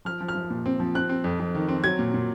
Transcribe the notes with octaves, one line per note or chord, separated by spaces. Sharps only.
F3 F6
F3
F6
F3
A#2
C4
F3
C4 F#6
C4
F2
F2
D#3
C4
F#3 G#6
A#2
A#2